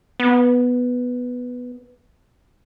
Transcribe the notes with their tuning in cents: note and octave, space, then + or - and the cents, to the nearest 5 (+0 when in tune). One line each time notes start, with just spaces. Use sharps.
B3 +0